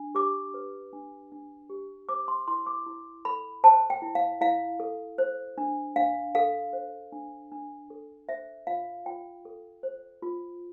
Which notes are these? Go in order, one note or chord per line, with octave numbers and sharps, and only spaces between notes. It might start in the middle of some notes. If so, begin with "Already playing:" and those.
Already playing: D4
G4 D6
B4
D4
D4
G4
C5 D6
C6
E4 C6
D6
E4
A4 B5
C5 A5
G5
E4
F5
E4 F5
A4
C5
D4
D4 F5
A4 F5
C5
D4
D4
A4
C5 E5
F4 F5
F4 G5
A4
C5
F4